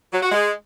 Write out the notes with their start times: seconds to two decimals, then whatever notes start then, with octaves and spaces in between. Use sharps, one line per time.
0.13 F#3
0.22 F#4
0.32 G#3